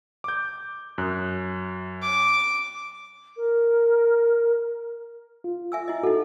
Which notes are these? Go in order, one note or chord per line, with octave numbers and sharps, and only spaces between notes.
D6 G6
F#2 F#6
D6
A#4
F4
E5 G#5 E6
E4 D#5
D#4 F#4 A4